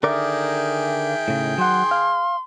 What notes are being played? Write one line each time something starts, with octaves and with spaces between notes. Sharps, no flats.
D3 D#3 G#4 A#4 D5 E5 G5
A2 C#3
F#3 F#5 C6
F5